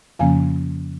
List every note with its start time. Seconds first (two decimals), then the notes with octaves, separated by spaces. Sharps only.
0.19 F2 C#3 F3 A#3 C#4 F5 G#5